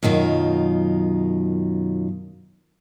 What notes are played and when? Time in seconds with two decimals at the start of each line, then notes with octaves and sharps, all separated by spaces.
0.03 F#2 B2 D#3 F4